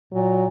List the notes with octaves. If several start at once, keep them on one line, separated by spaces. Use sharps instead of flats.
A#2 F#3